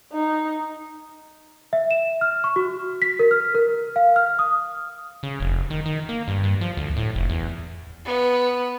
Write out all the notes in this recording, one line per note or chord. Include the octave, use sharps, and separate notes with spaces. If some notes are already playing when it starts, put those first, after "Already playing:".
D#4
E5
E7
F6
C#6
F#4
B6
A#4
F6
A#4
F5
F6
D#6
C#3
F1
D#3
D#3
A#3
G2
G2
F3
D2
A2
F1
E2
B3